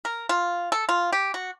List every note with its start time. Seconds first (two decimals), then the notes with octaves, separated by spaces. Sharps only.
0.05 A#4
0.29 F4
0.72 A4
0.89 F4
1.12 G4
1.34 F#4